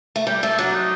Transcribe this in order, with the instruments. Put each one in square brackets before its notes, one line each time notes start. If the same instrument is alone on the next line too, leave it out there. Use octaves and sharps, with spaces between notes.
[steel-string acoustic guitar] A3
[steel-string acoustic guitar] G3 [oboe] G4
[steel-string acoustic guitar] A3 [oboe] A4
[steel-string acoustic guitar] F#3 [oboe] D4
[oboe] D#4